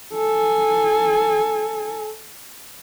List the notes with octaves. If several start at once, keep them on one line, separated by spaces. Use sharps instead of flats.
A4 G#5